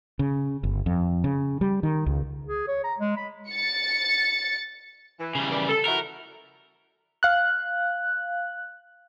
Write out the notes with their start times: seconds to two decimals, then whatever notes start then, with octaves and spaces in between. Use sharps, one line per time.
0.19 C#3
0.63 G1
0.86 F2
1.24 C#3
1.61 G3
1.83 D#3
2.06 C#2
2.47 G#4
2.68 C#5
2.84 A#5
2.99 G#3
3.17 B5
3.49 A6 C#7
5.19 E3
5.35 C#3 G3
5.50 D#3 E3 D5
5.68 A4
5.85 F3 E4 F#4 A#4
7.23 F5 F#6